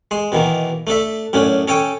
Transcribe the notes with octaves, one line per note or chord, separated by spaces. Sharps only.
G#3 C6
B2 D#3 E3 A#3
A3 D4 A4 E5
F#2 A2 C#4 D4
C#4 A4 C#5 G5 G#5